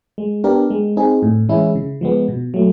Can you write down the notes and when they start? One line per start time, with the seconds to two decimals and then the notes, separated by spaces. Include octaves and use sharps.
0.18 G#3
0.44 B3 D4 G4 A#4
0.70 G#3
0.97 C4 D#4 G#4
1.22 A2
1.49 E3 G#3 C#4 E4
1.75 C#3
2.01 F3 G#3 B3
2.28 B2
2.54 F#3 A3